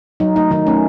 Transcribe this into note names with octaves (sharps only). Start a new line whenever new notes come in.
F#3 D#4
A3 D#4
D#3 D#4
A3 C#4